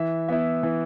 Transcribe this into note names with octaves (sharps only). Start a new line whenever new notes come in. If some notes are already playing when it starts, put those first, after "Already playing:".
Already playing: E3 E5
B3 E4 E5
E3